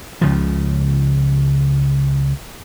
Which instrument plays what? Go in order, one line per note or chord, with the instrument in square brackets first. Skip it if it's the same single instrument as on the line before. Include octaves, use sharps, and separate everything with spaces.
[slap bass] C#2 C#3 F3